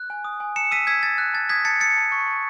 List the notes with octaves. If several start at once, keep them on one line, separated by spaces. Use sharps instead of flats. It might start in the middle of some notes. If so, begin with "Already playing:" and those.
Already playing: F#6
G#5
D#6
G#5
A5 C#7 E7
E6 B6 D#7
E6 G#6 B6
A5 A6
F#6
A5 A6
D#6 G#6 B6
A5 A6 C#7
E6 A6 C#7
A5
C#6
A5